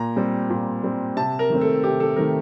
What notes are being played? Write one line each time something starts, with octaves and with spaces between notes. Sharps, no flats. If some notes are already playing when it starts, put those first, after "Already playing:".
Already playing: A#2 A#5
G3 C4
A#2
G3 C4
C3 A5
A#4
D#3 A3 C4
A4
C3 G4
A4
D#3 A3 C4 A#4